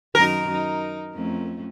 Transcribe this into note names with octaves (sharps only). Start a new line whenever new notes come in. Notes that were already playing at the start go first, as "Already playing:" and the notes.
F#2 D#3 D#4 A#4
D#4
F2 A3 C#4